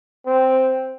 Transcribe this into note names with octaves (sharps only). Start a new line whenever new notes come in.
C4